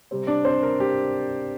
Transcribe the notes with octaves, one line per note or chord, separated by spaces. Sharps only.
C3 G3 C4
D4 D5
C4 C5
A#4
G4